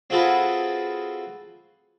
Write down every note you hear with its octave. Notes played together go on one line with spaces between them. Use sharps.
C4 F4 F#4 G#4 A4 B4